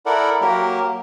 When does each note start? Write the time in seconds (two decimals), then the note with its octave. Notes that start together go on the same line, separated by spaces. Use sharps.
0.06 E4 A4 A#4 D5 F#5
0.41 F#3 A#3 G4 A#4